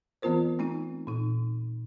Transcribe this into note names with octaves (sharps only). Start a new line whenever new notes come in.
E3 B3 C4 F4 A#4 C5
A3 C4 D#4
A#2 D#4